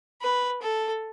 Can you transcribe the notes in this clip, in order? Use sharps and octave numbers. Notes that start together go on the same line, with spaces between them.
B4
A4